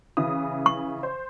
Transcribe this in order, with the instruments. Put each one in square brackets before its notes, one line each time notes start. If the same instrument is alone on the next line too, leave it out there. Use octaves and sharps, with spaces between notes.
[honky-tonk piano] C#3 E3 D#6
[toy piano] C#6
[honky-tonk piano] C5